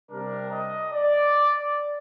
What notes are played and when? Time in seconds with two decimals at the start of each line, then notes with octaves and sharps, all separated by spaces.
0.11 C3 G3 D4 A#4
0.51 D#5
0.92 D5